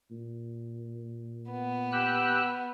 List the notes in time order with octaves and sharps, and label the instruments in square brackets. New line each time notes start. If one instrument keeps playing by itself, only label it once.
[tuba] A#2
[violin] B3
[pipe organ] G4 E6 F#6